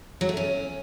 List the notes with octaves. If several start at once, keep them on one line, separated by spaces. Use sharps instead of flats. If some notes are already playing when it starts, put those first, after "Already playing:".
F#3
A3
C#4